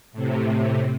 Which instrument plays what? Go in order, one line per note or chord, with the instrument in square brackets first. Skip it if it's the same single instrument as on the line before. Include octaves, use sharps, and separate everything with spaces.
[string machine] A2 C3